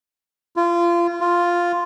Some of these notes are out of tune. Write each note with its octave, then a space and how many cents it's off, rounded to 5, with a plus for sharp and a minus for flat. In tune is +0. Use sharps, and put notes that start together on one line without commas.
F4 -25
F4 +0